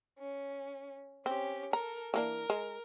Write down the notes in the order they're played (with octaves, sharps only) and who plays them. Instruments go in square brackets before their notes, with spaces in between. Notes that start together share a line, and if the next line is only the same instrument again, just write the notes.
[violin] C#4
[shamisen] C4 [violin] C#4 G4
[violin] A4 A#4 [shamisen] A#5
[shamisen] E3 A#3 D4 [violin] A#4
[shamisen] G#3